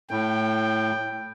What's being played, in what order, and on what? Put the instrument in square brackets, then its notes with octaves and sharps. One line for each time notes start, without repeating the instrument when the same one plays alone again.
[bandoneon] A2 [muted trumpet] G5